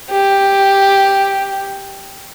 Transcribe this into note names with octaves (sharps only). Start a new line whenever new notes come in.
G4